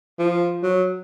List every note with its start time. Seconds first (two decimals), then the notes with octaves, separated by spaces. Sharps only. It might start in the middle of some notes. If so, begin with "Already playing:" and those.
0.19 F3
0.63 F#3